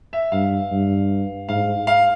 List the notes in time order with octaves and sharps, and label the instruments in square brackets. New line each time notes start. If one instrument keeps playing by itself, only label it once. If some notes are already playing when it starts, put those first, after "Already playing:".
[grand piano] E5
[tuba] G2 [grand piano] F5
[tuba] G2
[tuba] G#2 [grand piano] F5
[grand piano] F5